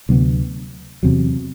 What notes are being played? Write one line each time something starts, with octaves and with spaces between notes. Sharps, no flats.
D2 C3 F#3 B3
E2 C3 F#3